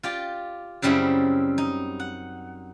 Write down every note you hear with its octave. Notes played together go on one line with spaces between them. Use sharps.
F4 G4 D5
F#2 C#3 G3 C4 E4
D#4
F#5